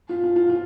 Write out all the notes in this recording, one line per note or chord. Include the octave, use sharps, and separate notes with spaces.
F4
F4
F4
F4